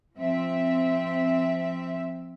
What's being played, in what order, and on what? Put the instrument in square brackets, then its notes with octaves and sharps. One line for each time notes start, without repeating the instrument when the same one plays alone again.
[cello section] F3 C4 E5